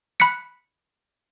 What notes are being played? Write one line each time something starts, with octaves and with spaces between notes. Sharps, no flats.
B5 F#6 B6 C#7